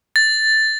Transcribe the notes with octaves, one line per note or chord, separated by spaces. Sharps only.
A6